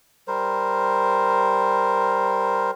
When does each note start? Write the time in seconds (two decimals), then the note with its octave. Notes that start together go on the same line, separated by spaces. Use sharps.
0.27 G3 A#4 C5